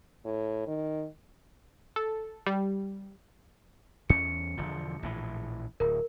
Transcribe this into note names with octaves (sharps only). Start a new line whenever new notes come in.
A2
D#3
A4
G3
E2 C#4 C#7
E1 D3 F3
A#1 A2 E3
D1 A#4